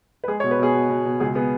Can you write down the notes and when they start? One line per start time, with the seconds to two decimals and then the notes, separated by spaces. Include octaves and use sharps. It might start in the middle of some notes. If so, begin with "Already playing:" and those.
0.24 B4
0.28 G#3 G#4
0.40 C#5
0.44 B2
0.51 B4
0.59 B2 G#4
0.74 B2
0.89 B2
1.05 B2
1.20 C#2 G#4
1.35 B3 G#4